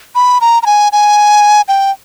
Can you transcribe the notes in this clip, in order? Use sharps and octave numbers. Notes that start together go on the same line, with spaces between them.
B5
A#5
A#5
G#5
G#5
G5